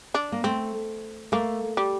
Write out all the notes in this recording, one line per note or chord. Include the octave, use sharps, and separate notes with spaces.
D4
A#3
A3 C4
A3 A#3
G3